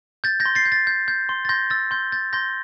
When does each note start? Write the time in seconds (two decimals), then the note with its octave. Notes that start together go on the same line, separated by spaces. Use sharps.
0.24 G6 A6
0.40 G6 A#6
0.46 C6
0.55 A6 C7
0.65 G6
0.72 A6
0.87 G6
1.08 G6
1.29 C6
1.45 A6
1.49 C6 G6 A#6
1.70 E6 A6
1.91 C6 G6
2.12 G6 A6
2.33 C6 G6 A#6